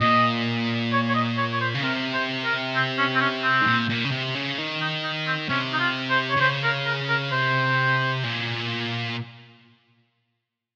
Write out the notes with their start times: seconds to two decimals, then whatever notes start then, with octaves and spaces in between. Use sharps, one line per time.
0.01 A#2 D#5
0.92 C#5
1.09 C#5
1.15 D#5
1.38 C#5
1.52 C#5
1.61 C5
1.75 C#3
1.83 C3 A#4
2.14 C5
2.45 A#4
2.75 C4
2.98 C#4
3.15 C4
3.21 C#4
3.43 C4
3.62 G#2
3.66 A#2
3.89 A#2
4.05 C#3
4.11 C3
4.35 C#3
4.58 D#3
4.80 D#4
5.03 D#4
5.27 C4
5.49 C3 C#4
5.73 D#4
5.80 F4
6.10 C5
6.30 C#5
6.36 C3
6.40 C#3 C5
6.64 A#4
6.86 A#4
7.09 A#4
7.32 C3 C5
8.23 A#2